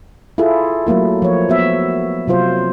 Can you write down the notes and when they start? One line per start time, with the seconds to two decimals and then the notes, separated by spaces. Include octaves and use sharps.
0.38 E4 F4 G#4 A4
0.87 F#3 A3 A#3 E4
1.22 F3 C#5
1.49 B3 F#4 E5
2.27 C3 F#3 F4 C5